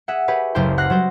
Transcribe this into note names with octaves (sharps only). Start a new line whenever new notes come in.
G#4 E5 F#5
G4 G#4 B4 C#5
F#1 C#2 G4 C5 G5 C6
F#5 C6 F6 F#6 A#6 C7
F#3 G3 C5